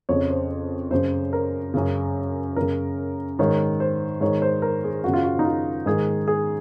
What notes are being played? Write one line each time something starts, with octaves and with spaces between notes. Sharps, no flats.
F2 C#3 C#5
C5
F#2 C#3 C5
A#4
F#2 C#3
F#2 C#3 A#4
G#2 D#3 C#5
C5
G#2 D#3 C#5
C5
A#4
G#4
F#2 C#3 F#4
F4
F#4
D#4
F4
G#2 D#3 G#4
G#4